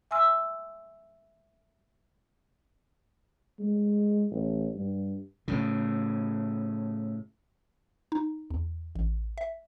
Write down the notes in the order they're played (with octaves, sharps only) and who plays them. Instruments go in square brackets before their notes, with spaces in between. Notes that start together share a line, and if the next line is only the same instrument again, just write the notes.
[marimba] E5 G#5 C6 E6 F6
[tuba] G#3
A1
G2
[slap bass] A2 C#3
[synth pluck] D#4
E2
A1
E5